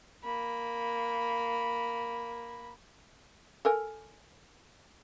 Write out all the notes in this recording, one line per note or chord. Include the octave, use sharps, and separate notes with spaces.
A#3 B5
A4 A#4 G#5